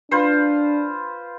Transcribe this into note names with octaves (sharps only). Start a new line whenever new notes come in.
D4 F4 B4 C5